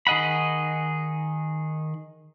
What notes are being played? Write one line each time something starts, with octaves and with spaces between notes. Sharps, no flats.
D#3 G#4 D#5 F#5 B5